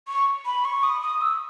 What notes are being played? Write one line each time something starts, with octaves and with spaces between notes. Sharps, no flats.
C#6
B5
C#6
D#6
D#6
E6